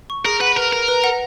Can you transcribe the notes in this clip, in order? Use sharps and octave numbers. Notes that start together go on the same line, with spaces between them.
C#6
G#4 A#4
B4 F#5
A#4 B4
A#4 A#5
B4
F#5